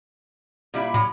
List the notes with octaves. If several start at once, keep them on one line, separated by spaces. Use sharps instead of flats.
A#2 G3 E4
A2 F#3